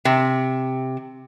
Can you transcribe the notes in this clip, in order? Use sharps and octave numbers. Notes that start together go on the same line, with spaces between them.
C3